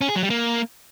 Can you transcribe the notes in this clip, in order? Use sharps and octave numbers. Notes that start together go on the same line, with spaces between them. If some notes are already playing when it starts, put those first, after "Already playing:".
C#4
G#4
F#3
G3
A#3